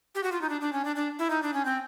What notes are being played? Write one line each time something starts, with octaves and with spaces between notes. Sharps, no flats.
G4
F#4
F4
D#4
D4
D4
C#4
D4
D4
E4
D#4
D4
C#4
C4